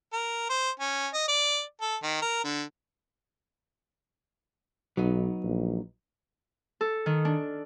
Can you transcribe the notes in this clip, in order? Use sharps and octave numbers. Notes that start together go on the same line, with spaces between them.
A#4
C5
C#4
D#5
D5
A4
D#3
A#4
D3
B1 F#3 B3 D#4
A#1
A4
D#3
D4